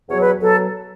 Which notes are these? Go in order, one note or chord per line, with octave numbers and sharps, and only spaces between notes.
E2 B2 F#3 C#5
B4
B2 F#3 A4